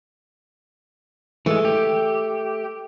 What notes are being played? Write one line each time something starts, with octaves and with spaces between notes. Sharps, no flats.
E3 G#3 A3
G4